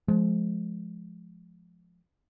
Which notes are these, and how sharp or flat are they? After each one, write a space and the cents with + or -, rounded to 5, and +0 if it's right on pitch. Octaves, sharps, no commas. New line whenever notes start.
F3 +0 G#3 +25